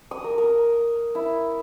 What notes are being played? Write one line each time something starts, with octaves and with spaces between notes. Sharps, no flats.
D#6
A#4
A#4
E4